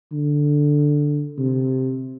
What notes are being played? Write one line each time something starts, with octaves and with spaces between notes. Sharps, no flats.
D3
C3